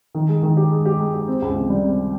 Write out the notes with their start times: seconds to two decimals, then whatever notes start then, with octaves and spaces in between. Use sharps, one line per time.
0.15 D#3
0.29 G#3
0.43 D#3
0.57 G4
0.71 G#3
0.86 G4
1.00 G#3
1.14 G4
1.27 C4
1.42 C#2
1.56 C3
1.70 G3
1.84 C3